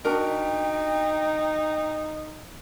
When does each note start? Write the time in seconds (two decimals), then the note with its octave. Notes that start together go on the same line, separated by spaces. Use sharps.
0.05 D4 D#4 F#4 A#4 G5